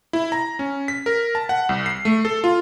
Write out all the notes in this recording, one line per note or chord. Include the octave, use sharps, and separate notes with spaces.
E4
A#5
C#4
B6
A#4
A5
F#5
C2
C7
A3
A4
F4